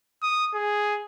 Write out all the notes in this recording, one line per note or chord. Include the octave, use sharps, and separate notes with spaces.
D#6
G#4